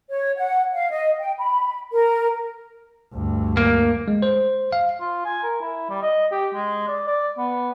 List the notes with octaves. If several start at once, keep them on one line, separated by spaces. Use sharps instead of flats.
C#5
F#5
F5
D#5
G5
B5
A#4
D2 G2
A#3
G#3
C5
F5
F4
G#5
A#4
E4
G3
D#5
G4
G#3
D5
D5
B3